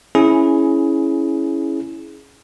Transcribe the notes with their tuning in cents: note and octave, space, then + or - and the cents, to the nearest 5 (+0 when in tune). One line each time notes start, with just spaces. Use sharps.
C#4 +0 E4 -5 G#4 +15